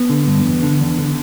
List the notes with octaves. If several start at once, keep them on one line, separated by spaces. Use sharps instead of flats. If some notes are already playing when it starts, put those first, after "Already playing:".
Already playing: B3
D3
G2
E2
D3
E2
D3